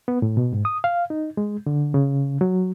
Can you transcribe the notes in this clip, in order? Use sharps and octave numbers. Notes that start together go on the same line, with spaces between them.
B3
A2
B2
G#2
D#6
F5
D#4
G#3
D3
C#3
F#3